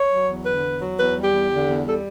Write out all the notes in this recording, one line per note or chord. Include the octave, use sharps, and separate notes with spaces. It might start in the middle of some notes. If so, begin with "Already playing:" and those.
Already playing: C#5
F#3
E2
D3 B4
E2
F#3
E2 B4
G3
G4
E2
D3
E2
G3 A4